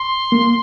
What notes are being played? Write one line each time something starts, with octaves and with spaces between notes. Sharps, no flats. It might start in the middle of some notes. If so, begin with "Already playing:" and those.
Already playing: C6
A#3